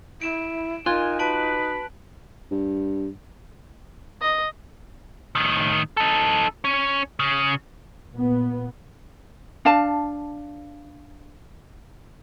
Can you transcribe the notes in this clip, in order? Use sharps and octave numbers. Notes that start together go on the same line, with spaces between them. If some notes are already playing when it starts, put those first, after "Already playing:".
E4 D7 E7
D#4 F4 A#4 G#5 F#6
F#4 B4 A5 D7 F#7
G2
D#5
A2 D#3
D#4 A4
C#4
C#3
A#2 B3
D4 F5 A5